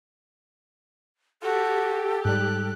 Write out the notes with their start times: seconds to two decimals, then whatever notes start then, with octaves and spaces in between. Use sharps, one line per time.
1.42 F#4 G4 A4
2.25 G#2 G3 F#6